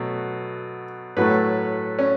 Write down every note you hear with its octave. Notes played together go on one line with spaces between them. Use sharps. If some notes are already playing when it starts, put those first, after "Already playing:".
Already playing: B2 F#3 A3
A2 F#3 A3 B4
C#4